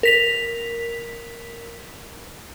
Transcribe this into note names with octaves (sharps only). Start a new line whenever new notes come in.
A#4 B6 F7